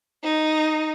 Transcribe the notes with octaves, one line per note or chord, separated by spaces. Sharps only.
D#4